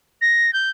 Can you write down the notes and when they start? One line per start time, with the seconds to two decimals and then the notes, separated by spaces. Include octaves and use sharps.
0.21 A#6
0.53 G6